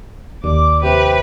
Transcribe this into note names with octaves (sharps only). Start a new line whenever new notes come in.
D#2 D5 D6
C3 G4 B4